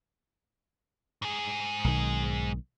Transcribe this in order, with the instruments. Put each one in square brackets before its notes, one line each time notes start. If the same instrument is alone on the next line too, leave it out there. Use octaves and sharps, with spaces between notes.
[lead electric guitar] G#2 G#4
[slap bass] B1 D#3